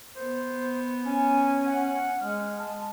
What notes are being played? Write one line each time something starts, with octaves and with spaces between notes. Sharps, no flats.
B3 C5
C#4 G#5
F#5
G#3 F6
A5